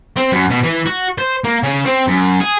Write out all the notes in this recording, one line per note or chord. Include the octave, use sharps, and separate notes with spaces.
C4
F#2
B2
E3
F#4
C5
A#3
C#3
C4
F#2
G#4